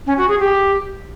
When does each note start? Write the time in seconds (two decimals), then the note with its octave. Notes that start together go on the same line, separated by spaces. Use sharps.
0.06 C#4
0.17 F#4
0.28 G#4
0.39 G4